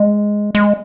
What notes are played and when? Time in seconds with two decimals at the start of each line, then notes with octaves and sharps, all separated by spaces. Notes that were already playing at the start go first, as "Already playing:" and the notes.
Already playing: G#3
0.55 G#3